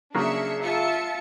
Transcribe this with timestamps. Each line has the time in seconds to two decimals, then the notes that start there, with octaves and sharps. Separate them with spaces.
0.14 C#3 F#3 A#3 D4 G#4 E5 C#7
0.62 F4 E5 A5 C#7